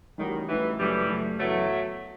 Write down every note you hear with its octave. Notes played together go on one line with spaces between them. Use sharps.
A1 A2 D#3 G3 D#4 F#4
A1 A2 E3 G3 D#4 F#4
F#1 F#2 E3 F#3 G3 A3
F#1 F#2 F#3 A3
F#2 E3 F#3 A3 B3 F#4